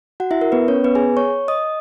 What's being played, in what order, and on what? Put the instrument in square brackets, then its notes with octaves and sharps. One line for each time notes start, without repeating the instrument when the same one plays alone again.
[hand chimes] F#4 F#5
E4 E5
A#4
B3 B4
C#4 C#5
B3 B4
G#4 G#5
C#5 C#6
D#5 D#6